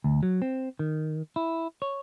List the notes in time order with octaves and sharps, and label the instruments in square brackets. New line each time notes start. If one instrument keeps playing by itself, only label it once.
[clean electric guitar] D2
F#3
C4
D#3
E4
C#5